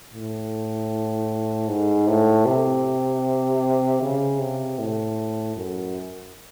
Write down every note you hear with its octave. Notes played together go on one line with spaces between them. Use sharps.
A2
G#2
A2
C3
C#3
C3
A2
F#2